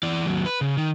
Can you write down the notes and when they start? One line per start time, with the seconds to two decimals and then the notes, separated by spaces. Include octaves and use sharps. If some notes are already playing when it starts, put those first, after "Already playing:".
0.03 E3 D5
0.26 D#2 F#3
0.46 B4
0.61 C#3
0.77 D#3